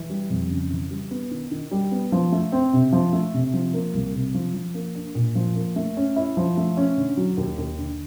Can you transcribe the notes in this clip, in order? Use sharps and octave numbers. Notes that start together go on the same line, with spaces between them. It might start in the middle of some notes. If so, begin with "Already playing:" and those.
Already playing: E3
G3
F2
C#3
E3
G3
B3
D#3
D#3
G3
B3
F3
A3
C4
C3
F3
A3
C3
F3
A#3
C2
C3
F3
F3
A#3
D4
A#2
F3
A#3
A3
C#4
E4
F3
A3
C#4
D3
F#3
D#2
D#2
D3